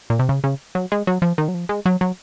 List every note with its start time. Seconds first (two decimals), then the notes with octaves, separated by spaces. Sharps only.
0.10 A#2
0.19 C3
0.29 C#3
0.44 C#3
0.75 F#3
0.92 G#3
1.07 F#3
1.22 F3
1.38 D#3
1.48 F#3
1.54 F3
1.69 G#3
1.86 F#3
2.01 F#3